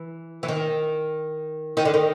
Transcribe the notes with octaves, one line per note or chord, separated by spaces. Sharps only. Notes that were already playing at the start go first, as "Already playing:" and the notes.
Already playing: E3
E3
D#3
D#3
D3
D#3